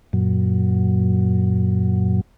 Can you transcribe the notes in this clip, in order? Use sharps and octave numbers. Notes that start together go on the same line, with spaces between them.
F#2 A#2 F#3